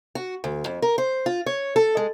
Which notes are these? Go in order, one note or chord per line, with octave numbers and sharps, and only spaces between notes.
F#4
D2
F2
A#4
C5
F4
C#5
A4
G#3